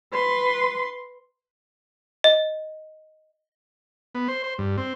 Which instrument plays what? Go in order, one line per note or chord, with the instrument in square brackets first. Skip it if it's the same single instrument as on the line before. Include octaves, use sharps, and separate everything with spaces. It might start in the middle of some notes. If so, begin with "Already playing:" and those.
[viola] B4 C6
[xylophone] D#5
[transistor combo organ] B3
C5
C5
G2
C4